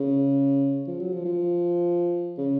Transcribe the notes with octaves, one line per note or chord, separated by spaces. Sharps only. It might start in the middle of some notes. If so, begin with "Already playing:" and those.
Already playing: C#3
F3
F#3
F3
F3
C#3